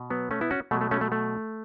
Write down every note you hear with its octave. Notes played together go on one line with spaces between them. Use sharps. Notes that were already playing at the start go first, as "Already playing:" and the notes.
Already playing: B2
F#3 B3
A3 C#4
B3 E4
C#4 F#4
B2 F#3 A3
A3
A3 C#4
A3
A3